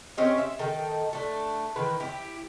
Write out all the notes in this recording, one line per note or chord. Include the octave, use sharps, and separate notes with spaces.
C4 C#4 G4 D#5
E5
D#3 D#4 A4 G5
A3 D4
D#3 E3 B4
E4 G4